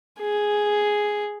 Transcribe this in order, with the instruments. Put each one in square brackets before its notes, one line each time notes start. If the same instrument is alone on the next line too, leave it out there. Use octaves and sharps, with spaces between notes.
[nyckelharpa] G#4